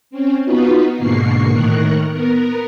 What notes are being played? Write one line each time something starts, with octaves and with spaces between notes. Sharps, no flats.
C4 C#4
B3 D#4 F4 F#4 B4
G#2 B2 D3 A#3 C#6 C7
A2 D#3 A#4 C#6 F#6
B3 A#4